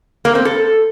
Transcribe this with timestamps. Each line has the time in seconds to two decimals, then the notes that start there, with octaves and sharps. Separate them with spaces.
0.25 A#3
0.35 C4
0.45 A4